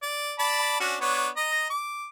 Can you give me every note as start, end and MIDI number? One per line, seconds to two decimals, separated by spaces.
0.02 0.34 74
0.39 0.80 74
0.39 0.80 81
0.39 0.80 83
0.80 0.96 61
0.80 0.96 62
0.80 0.96 66
1.01 1.28 59
1.01 1.28 62
1.01 1.28 73
1.37 1.67 75
1.37 1.67 82
1.70 2.07 86